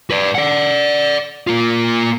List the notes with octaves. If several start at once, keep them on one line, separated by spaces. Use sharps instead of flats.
B4 D5
D5 F#5
A#3 F4